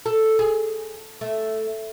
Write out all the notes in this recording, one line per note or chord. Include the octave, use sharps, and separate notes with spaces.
A4
G#4
A3